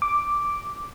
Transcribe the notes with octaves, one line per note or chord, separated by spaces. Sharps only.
D6